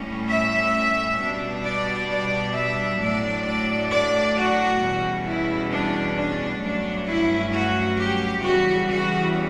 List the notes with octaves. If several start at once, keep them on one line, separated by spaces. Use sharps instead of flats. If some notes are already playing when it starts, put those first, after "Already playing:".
Already playing: A2 G3 C#4
E5
B2 G3 D4
D5
D5
E5
A2 F#3 A3 D4 D5
D5
D5
F#4
E2 B2 G3 C#4
E4
D4
D4
G2 F#3 A3 C#4 D4
E4
F#4
G4
E2 C#3 E3 G3 F#4
F#4